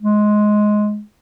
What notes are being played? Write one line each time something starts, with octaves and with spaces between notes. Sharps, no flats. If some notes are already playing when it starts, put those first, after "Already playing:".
G#3